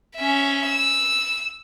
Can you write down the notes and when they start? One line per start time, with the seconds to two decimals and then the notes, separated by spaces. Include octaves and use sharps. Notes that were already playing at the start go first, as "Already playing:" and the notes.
0.16 C#4 E5
0.66 E6